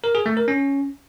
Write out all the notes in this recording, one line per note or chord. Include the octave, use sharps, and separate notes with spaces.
A#4
G#4
A3
A#4
C#4